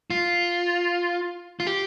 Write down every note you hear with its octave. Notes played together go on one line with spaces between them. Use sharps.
F4
F4
G4